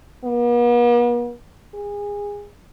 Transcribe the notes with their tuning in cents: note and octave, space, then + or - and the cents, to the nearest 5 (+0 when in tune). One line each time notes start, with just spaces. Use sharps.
B3 -45
G#4 -25